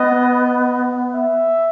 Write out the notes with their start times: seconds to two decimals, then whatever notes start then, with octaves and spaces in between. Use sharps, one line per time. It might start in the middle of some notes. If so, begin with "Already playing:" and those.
Already playing: B3 D#5
1.15 E5